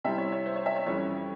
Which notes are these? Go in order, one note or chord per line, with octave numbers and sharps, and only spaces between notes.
C3 G3 C4 E4 E5
C#5
C#5
C5
C#5
E5
C#5
F2 E3 G3 C#4 C#5